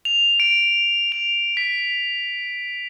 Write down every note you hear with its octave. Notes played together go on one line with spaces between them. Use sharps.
F7
D7
F7
B6